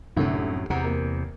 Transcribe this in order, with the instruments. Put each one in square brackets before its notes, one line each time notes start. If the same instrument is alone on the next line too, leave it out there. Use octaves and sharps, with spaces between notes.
[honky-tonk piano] C2 D3 A3 [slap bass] F#2 A2
[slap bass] E2 C3 [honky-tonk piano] F#5 A#5
[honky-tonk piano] A#3